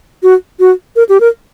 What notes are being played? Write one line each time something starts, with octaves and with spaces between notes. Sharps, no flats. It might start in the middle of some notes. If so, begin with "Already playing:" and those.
F#4
F#4
A#4
G4
A#4